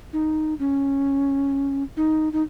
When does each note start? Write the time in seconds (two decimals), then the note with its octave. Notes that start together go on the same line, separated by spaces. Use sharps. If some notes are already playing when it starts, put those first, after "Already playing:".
0.13 D#4
0.59 C#4
1.97 D#4
2.33 D#4